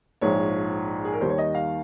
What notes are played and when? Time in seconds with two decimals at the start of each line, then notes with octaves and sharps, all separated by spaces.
0.21 A#1 G#2 F3 C#5
1.05 G#4
1.13 A#4
1.21 D#2 D#3 G3 C5
1.29 C#5
1.38 D#5
1.55 F5